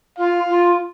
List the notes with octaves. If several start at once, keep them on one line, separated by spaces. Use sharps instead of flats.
F4 F5
F4